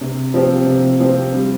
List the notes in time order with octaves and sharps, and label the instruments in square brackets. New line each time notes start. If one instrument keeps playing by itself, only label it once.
[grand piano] C3
F3 C4 G4
C3
F3 C4 G4
G3